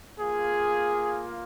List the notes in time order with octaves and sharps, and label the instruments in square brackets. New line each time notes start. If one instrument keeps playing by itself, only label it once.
[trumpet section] A#3 F4 G#4